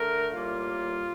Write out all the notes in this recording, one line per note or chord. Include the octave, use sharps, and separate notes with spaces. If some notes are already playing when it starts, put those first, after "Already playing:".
Already playing: D3 A3 A#4
A2 G3 A#3 F4